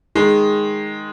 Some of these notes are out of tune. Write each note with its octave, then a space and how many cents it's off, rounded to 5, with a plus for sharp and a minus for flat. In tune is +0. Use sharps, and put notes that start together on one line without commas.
D#3 +0 G#3 +0 D#4 +0